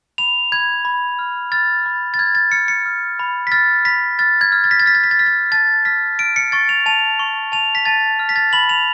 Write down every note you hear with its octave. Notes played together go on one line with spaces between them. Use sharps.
B5 F7
B5 G#6
B5
F6
F6 A6
B5
A6
F6 G#6
A6
F6 C#7
C#7
F6
B5
B6
F6 A6
B5 B6
F6 A6
G#6
F6
A6
B6
A6
F6 B6
A6
B6
A6
F6 B6
A6
A5 A6
F6 B6
F6 D7
C#7
C#6 A6
F7
A5 F7
C#6
A5 F7
B6
A5 A6
F6
B6
A6
B5 F#7
F7